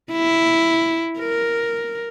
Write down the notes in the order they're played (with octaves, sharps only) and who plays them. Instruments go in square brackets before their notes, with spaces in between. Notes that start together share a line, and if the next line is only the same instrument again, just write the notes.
[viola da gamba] E4
A#4